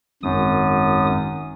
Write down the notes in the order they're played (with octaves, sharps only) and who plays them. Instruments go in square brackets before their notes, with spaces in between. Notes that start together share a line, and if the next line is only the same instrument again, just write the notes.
[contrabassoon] G#1 [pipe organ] F#2 D#6